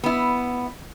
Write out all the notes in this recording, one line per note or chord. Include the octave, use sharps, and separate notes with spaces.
B3 E4